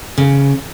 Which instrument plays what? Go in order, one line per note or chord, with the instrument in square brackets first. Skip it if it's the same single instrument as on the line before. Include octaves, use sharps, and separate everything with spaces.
[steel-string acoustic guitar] C#3